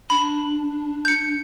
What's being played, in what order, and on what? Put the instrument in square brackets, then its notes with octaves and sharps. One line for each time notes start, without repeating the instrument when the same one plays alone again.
[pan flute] D4 [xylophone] B5
[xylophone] G6 C#7